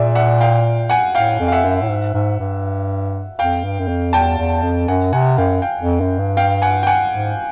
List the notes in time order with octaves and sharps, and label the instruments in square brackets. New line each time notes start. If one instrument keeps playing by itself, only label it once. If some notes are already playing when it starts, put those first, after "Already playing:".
Already playing: [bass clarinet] A#2 [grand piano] G#4 D5 E5
[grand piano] E5 F#5
F5 G5
F#5 G#5
[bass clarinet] A2 [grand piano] F5 G5
[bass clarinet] F2
[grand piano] F5
E5 F#5
[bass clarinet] F#2
A2
G#2
G#2
G2
[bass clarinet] F2 [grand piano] F5 G5
[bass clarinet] G2
F#2
F2
[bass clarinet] E2 [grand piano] G5 A5
[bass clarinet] E2
F2
[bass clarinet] F#2 [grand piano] F#5 G#5
[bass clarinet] C3 [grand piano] F#5 G#5
[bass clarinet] F#2 [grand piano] F5 G5
[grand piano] F5 G5
[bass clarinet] F2
F#2
G2
[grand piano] F5 G5
F#5 G#5
G5
F#5 G#5
[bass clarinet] G#2